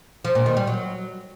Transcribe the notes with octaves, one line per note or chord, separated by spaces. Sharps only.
F3
A#2
D#3
G3
F#3